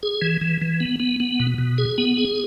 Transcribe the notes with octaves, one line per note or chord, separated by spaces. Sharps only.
G#4
E3
E3
E3
B3
B3
B3
B2
B2
G#4
B3
G#4